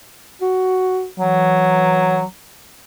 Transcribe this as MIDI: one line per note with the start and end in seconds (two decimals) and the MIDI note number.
0.41 1.07 66
1.19 2.23 52
1.19 2.23 54